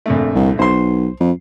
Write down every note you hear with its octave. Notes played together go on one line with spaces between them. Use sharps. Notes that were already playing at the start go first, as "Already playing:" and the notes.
A#1 F2 A3
C2
B1 C5 C6
F2